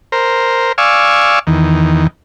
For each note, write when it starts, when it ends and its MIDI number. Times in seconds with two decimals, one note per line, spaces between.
0.12 0.72 70
0.12 0.72 72
0.78 1.39 74
0.78 1.39 77
0.78 1.39 80
0.78 1.39 85
0.78 1.39 88
1.47 2.07 40
1.47 2.07 51